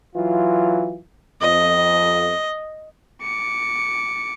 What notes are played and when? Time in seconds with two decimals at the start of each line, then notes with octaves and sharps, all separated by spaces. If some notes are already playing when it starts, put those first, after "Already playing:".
0.16 E3 F#3 F4
1.41 F2 D#5
3.23 D6 C#7